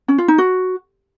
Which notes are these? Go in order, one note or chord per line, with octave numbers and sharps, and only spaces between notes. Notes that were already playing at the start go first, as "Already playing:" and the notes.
C#4
F4
D#4
F#4